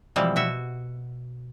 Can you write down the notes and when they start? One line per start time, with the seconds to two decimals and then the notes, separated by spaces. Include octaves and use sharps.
0.16 B2 E3 F3 G3 G#3 C4
0.36 B2 F#4 E5